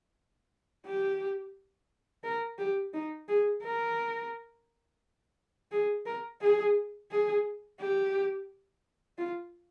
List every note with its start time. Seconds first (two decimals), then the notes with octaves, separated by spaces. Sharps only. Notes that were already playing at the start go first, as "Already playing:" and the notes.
0.86 G4
2.24 A#4
2.58 G4
2.94 D#4
3.29 G#4
3.63 A#4
5.72 G#4
6.06 A#4
6.41 G#4
7.11 G#4
7.80 G4
9.18 F4